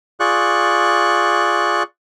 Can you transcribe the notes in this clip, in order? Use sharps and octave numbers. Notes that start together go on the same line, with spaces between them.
F4 G#4 D5 C#6 F#6